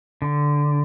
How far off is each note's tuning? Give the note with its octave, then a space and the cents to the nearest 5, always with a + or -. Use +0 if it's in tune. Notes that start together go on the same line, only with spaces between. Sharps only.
D3 -5